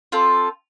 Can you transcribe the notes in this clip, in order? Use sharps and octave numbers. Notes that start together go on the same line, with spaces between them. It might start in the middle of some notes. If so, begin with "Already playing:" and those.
C4 F4 A4